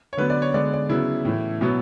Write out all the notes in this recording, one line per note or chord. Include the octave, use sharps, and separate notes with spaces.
C#5
D3 F#3 B3 B4
D5
C#5
D3 G#3 B3 D5
D5
C#3 F#3 B3 E4
A2 E3 A3
B2 F#3 B3